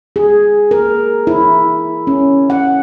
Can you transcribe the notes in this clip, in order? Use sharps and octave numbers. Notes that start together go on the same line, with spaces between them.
G#4
A#4
E4
C#4
F#5